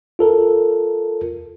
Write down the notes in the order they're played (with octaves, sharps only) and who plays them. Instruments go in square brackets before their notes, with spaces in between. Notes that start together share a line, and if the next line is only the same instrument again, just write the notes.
[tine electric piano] F4 A4 A#4